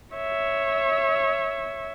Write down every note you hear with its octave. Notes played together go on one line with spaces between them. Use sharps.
C#5 E5